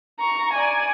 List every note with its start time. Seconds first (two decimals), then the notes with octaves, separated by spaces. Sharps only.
0.20 A#5 C#6
0.53 D5 G#5